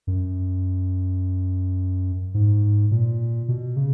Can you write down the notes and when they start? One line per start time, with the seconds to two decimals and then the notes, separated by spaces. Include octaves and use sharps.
0.07 F#2
2.34 G#2
2.91 A#2
3.48 B2
3.77 C#3